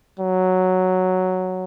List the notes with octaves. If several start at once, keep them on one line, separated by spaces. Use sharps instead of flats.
F#3